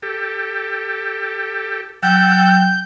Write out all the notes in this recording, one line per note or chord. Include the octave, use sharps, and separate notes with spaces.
G4 A4
F#3 F#5 G5 A5 E6 G6